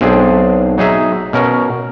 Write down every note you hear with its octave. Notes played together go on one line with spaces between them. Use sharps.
B1 C4 D4 G#4 C5 D5
F#3 D#4 G#4 E5
B2 C#4 A#4